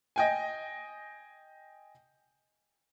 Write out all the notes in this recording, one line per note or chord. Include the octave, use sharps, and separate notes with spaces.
D#5 G5 G#5